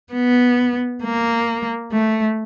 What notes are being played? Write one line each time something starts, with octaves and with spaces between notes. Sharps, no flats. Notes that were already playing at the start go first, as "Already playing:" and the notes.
B3
A#3
A3